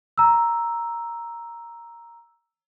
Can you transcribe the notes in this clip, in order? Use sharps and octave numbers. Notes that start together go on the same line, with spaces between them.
A#5 E6